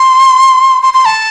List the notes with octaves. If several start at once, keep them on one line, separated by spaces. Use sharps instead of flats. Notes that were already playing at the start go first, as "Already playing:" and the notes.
Already playing: C6
C6
C6
A5